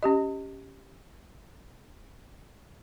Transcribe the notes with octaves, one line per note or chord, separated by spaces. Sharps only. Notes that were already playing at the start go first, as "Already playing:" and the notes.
C#4 G4 D#5